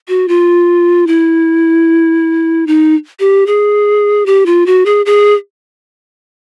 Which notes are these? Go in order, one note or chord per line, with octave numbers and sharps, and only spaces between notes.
F#4
F4
E4
D#4
G4
G#4
G4
F4
F#4
G#4
G#4